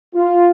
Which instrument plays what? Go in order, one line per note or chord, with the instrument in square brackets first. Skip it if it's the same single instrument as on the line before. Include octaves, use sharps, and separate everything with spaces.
[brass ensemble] F4